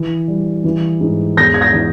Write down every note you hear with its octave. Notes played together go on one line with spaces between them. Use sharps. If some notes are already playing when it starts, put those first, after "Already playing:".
Already playing: E3
G3
E3
G#2
E2 G6 A#6
G#6
G6 A#6
E3